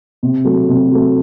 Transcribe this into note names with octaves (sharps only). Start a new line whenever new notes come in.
C3
F#3 A3
C3
F#3 A3